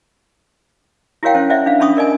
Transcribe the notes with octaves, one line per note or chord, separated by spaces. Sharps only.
E4 F#4 A#4 C#5 F5 G5
C#4 C5
C5 D5 E5 F#5
D4 F5
C#4 D4 B5 C#6 D#6
A#4 D5 D#5 G#5